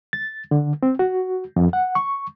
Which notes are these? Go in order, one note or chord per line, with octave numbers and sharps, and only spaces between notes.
A6
D3
C4
F#4
F2
F#5
C#6